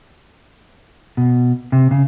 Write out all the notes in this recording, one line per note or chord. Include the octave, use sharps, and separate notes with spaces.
B2
C3
C#3